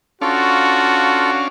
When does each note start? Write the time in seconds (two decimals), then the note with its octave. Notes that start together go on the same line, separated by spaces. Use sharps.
0.21 C#4 D4 F4 F#4 A4 F5